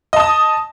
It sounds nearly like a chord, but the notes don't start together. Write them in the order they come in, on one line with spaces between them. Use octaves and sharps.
D#5 A5 D#6